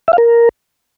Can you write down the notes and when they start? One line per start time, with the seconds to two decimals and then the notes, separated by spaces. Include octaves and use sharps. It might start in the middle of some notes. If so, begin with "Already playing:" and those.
0.08 E5
0.13 F5
0.18 A#4